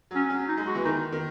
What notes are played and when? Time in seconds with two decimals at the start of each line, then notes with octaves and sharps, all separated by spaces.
0.11 F#3 C#4
0.29 F#3 C#4
0.48 D#4
0.57 G#3
0.67 F#4
0.75 E3
0.85 D#3 D#4
1.12 D#3